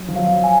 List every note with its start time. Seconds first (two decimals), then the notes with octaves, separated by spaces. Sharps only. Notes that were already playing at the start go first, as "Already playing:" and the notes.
Already playing: F#3
0.08 F3
0.15 F#3 F5
0.44 G#5